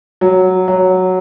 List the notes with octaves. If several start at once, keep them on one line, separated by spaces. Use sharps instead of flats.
F#3
F#3